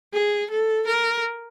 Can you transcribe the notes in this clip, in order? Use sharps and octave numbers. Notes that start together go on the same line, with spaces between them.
G#4
A4
A#4